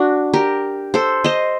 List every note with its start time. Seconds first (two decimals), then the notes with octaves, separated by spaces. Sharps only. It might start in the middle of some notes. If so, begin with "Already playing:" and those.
Already playing: D4 F#4
0.33 G4 A#4
0.94 A4 C5
1.24 C5 D#5